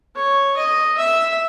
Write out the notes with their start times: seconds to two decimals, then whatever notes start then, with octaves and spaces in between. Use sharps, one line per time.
0.16 C#5
0.57 D#5
0.97 E5